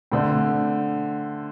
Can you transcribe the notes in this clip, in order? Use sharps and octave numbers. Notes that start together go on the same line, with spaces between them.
D3 A3 C4